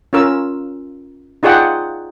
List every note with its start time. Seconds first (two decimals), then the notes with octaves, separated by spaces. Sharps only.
0.13 C#4 F4 A#4 E6
1.43 D#4 F4 G#4 D5 F#5 G5